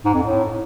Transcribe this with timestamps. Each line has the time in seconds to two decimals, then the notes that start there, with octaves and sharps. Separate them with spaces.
0.05 G#2
0.14 F2
0.23 A2